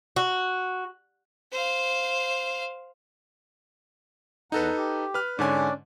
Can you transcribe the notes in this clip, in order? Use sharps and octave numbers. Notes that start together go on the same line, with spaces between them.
F#4
C5 F5
E2 D#4 A4 B4 F#5 A#5
G4
B4 F6
G#2 D3 C#4 D4 D5 G#5